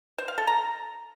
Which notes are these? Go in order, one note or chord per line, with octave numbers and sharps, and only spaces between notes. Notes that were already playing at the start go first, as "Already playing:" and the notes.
C5
F5
A4
A#5